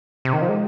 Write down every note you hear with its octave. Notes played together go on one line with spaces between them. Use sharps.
C3
D#3
F3
G#3